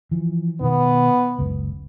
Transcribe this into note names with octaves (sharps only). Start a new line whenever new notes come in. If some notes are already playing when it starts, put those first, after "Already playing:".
E3 F3
B2 D#3 B3
F#1 C#2